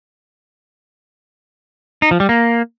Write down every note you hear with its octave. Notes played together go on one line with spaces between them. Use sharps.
D#4
F3
G3
A#3